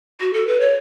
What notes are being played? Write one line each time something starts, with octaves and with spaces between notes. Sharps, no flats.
F#4
A4
B4
C#5